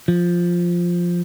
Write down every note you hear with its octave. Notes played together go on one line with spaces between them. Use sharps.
F3